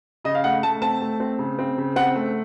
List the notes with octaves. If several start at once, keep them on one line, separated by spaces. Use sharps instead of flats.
C#3 D#5
F5
A3 F#5
A3 A5
C4 A5
A3
C4
C#3
C4
C#3
C4 F#5
A3